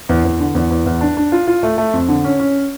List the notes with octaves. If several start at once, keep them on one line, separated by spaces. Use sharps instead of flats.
E2
E2
D3
E2
E2
E2
D4
D4
F4
F4
A3
A3
F2
D3
C#4
C#4